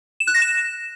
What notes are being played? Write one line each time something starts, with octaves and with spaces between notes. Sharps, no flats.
E7
F#6
A#6
E7